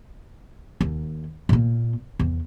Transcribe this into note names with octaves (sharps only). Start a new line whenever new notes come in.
D#2
A#2 A#3
E2